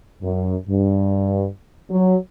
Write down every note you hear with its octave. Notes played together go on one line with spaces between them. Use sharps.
F#2
G2
F#3